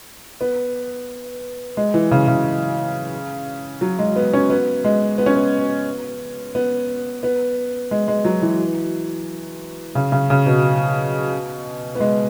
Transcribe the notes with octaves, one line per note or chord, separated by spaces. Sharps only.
B3
G#3
E3
C#3
C#3
F#3
G#3
B3
C#4
B3
G#3
B3
C#4
B3
B3
B3
G#3
G#3
F#3
E3
C#3
C#3
C#3
B2
B3
G#3